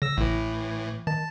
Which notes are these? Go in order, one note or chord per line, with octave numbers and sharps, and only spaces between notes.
C#3 E6 A#6
A1 A2 E3
D#3 A5